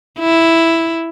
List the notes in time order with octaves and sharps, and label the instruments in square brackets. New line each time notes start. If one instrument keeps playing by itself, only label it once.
[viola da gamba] E4